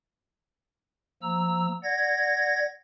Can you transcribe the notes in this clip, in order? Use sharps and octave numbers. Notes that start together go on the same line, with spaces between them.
F3 A#3 A#5 E6
D5 F#5 G#6 A#6